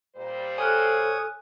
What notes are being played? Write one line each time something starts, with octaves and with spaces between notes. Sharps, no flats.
A#2 G3 C5
A4 C#5 G#5 D#6 F6 F#6